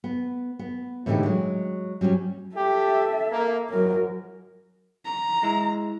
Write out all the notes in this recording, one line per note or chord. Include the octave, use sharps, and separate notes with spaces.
B3
B3
A2 D3 E3 G#3 D#4 G4
F#3 G#3
F#3 G3 B3 C#4
G4 A4 E5
A#3
G#1 F#2 F#3 A#4
A#5
G#3 E4